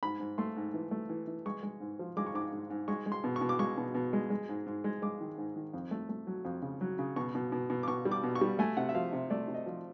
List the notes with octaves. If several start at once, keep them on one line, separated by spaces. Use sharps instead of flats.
G#2 B5
G#2
A3 C6
G#2
E3
A3
E3
E3
G#3 C#6
G#3
G#2
F3
G#3 D6
C#6
G#2 D6
G#2
G#2
G#3 C#6
G#3
C6
B2
C#6
B2
D6
G#3 C#6
B2
B2
G#3
G#3
G#2
G#2
G#3
G#3 D6
D#3
G#2
D#3
F2
A3
A3
F#3
F2
C#3
F#3
C#3
B2 C#6
B2
B2
B2
D6
B2 C#6
G3
D6
B2
C#6
G3
A3 G#5
C3 F#5
E5
F3 F5
C3
A3 D5
C3
D#5
F3